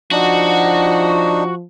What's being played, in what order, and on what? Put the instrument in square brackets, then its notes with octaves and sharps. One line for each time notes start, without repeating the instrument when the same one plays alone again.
[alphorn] F3 [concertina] D4 D#4 [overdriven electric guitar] F#4